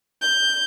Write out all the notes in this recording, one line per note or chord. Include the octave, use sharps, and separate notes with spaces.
G6